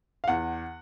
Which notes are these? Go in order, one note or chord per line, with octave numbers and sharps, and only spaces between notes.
F5
E2 F#5